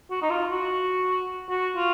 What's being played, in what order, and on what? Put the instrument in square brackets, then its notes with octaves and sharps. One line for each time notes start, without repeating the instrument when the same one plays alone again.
[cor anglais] F#4
D#4
F4
F#4
F#4
F4